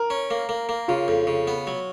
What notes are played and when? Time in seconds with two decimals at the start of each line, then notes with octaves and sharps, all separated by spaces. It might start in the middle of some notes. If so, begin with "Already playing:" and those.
Already playing: A#4
0.10 C#4
0.31 A#3
0.49 A#3
0.69 A#3
0.88 C#3 F4
1.08 F2
1.27 C#3
1.48 B3
1.67 F#3